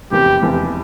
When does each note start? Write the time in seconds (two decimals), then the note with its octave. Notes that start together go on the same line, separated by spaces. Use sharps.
0.11 F1 E2 C3 G4
0.42 F1 E2 C3